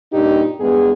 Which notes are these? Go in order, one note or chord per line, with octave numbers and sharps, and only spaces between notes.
G2 A#2 D4 D#4 G4
E2 G2 G#3 B3 G#4